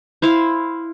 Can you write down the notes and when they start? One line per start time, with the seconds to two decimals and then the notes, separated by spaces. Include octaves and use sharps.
0.22 E4 C5 F5